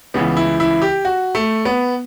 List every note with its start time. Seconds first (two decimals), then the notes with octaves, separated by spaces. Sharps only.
0.14 C#2 C#3 E3 B3
0.37 E4
0.60 E4
0.82 G4
1.05 F#4
1.35 A3
1.65 B3